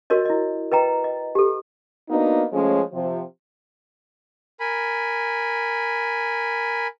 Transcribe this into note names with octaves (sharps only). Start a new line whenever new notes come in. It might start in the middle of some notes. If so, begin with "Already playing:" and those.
F#4 A#4 C#5 D#5
E4 D#5
B4 D#5 G5 A#5
D#5
G4 A4
A#3 B3 D4 D#4 F#4
F3 G#3 A3 C#4
C3 F3
A#4 G#5 B5